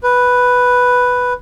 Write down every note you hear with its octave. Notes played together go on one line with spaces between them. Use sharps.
B4